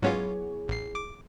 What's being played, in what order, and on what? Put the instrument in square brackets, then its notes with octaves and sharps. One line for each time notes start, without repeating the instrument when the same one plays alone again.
[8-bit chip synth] G#2 C#4 F4 [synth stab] F#3 B3 C#5 [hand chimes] E4 G#4
[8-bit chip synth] A1 C7
D6